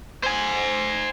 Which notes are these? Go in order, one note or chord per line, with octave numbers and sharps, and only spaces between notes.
C5 G#5